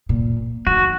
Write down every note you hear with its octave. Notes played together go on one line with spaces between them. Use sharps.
A#2
D#3 F#4